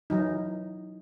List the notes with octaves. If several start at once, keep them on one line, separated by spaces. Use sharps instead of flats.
E3 F#3 D#4